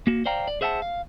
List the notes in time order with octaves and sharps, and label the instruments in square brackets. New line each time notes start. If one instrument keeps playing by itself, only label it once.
[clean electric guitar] A#3 F#4
C5 D5 F5 G5 A#5
D5
G#4 C5 E5 F#5 G#5 A5
F5